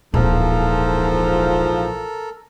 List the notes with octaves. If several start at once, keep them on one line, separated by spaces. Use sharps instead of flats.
D1 A#1 G#2 E3 F3 A4 A#4